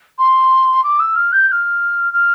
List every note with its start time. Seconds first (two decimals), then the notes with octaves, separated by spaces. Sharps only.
0.18 C6
0.83 D6
0.99 E6
1.16 F6
1.32 G6
1.48 G6
1.52 F6
2.13 F6